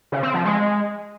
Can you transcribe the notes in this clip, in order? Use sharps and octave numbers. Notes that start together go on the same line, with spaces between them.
C#3
C4
F3
G#3